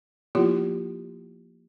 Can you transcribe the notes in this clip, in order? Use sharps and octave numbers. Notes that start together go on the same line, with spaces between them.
F3 A#3 B3 E4 F4 G4